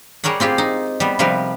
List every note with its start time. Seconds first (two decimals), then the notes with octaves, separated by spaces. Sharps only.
0.24 G3 G#4 A#4 C#5 F#5
0.40 C4 F4 G4 G#4
0.58 D#4
1.00 G3 B3
1.19 C3 F3 G3 A#4 B4